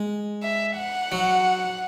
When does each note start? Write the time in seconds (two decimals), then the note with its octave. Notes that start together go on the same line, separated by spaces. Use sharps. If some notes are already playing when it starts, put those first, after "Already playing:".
Already playing: G#3
0.43 E5
0.77 F#5
1.12 F#3